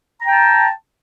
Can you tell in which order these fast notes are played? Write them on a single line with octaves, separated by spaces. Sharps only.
A#5 G5 A5